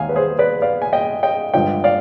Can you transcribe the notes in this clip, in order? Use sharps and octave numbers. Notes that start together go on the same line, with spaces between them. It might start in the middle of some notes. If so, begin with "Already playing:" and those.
Already playing: D#2 D#3 G#3 F5 G#5
B4
G#4 C5
B4 D5
D5 F5
G#5
D#5 G5
D#5 G5
G2 D3 F3 G#3 D#5 G5
D5 F5